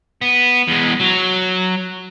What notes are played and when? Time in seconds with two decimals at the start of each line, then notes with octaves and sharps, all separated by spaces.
0.21 B3
0.68 E2 G#3
1.00 F#3